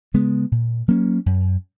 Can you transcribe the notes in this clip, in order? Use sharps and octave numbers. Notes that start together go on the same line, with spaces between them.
C#3 G#3 B3
A#2
F#3 A#3 C#4
F#2